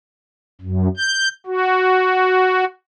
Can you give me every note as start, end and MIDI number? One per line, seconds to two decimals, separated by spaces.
0.61 0.88 42
0.97 1.29 91
1.46 2.65 66